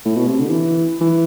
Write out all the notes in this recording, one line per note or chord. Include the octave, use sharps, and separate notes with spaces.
A2
B2
C3
D3
E3
E3